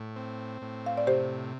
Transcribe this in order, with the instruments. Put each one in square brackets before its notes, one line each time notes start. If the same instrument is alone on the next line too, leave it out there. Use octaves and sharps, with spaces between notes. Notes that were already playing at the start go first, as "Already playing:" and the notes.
Already playing: [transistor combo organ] A2
C4
A2
[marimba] F5
D5
[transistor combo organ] C3 [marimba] G4 C5